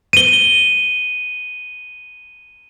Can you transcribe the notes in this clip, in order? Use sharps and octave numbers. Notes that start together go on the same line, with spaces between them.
D#7 G7